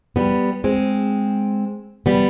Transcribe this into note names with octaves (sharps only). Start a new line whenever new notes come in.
G3 B3
G#3 C4
G3 B3